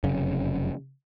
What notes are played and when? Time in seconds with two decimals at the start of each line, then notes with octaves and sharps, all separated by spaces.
0.04 F1 F#2 C#3